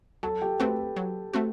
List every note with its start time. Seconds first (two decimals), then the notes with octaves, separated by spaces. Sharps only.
0.23 F#3 A4 A5
0.42 G4 G5
0.60 A3 C4 F#4 B4
0.79 A4
0.96 F#3
1.33 A3 C4 F#4